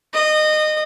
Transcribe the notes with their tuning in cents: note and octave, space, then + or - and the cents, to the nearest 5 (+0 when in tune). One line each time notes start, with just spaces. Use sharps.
D#5 -20